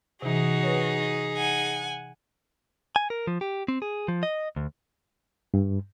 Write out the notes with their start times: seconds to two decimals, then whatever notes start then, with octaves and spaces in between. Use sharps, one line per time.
0.22 C3 E3 D#4 F#4 G#4
0.63 B4 C#5
1.36 F#5 G#5
2.96 G#5
3.10 A#4
3.27 F3
3.41 G4
3.68 C4
3.82 G#4
4.08 F3
4.23 D#5
4.56 D2
5.54 G2